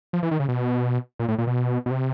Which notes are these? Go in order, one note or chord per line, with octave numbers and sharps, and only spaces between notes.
F3
E3
D#3
C#3
B2
A#2
A2
A#2
B2
B2
C3